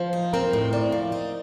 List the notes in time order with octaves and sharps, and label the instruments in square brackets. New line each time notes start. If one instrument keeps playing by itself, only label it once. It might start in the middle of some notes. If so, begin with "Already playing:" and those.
Already playing: [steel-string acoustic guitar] F3 [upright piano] C5
[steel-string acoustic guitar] D#4
[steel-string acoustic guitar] C4 [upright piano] A#4
[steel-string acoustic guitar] A2
[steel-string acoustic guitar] C4 [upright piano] D5
[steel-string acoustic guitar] F3
D#4